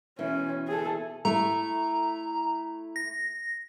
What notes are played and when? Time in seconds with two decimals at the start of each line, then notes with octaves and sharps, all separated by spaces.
0.19 B2 E3 C#4
0.67 G#4 A4
1.25 A3 E4 A#5
2.96 A#6